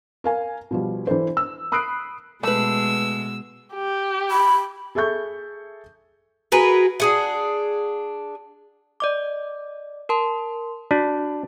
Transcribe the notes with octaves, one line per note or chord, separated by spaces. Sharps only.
A#4 F5 G#5
B2 F3 G3
E3 D4 A4 C5
E6
B5 D#6 E6 F#6 C7 D7
B2 G#3 A3 B4 E6
G4
B5
G#4 A4 E5 C#6 G6
F#4 G#4 A#4 B4
D4 G#4 F#5
D5 D#5 D6
A#4 A5 C6
D4 F#4